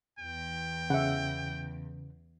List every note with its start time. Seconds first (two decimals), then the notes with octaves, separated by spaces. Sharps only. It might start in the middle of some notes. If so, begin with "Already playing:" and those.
0.19 E2 G5
0.90 C#3 E5 F#5